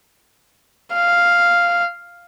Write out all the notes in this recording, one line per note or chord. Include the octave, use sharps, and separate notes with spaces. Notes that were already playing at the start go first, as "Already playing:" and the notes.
F5